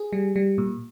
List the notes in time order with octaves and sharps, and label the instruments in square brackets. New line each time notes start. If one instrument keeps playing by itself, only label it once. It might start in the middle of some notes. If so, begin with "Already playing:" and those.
Already playing: [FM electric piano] G#4
G3
G3
A#2